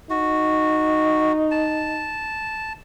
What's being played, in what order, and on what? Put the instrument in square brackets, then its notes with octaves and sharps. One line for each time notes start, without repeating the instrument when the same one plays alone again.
[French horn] D#4 [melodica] F#4
[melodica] A5